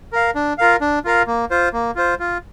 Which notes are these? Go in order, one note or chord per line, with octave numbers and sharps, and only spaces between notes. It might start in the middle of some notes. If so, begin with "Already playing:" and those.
A#4 F5
D4
F4 A#4 F5
D4
F4 A#4 F5
A#3
F4 C5
A#3
F4 C5
F4